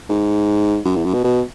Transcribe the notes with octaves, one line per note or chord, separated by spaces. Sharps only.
G#2
F#2
E2
F#2
B2
B2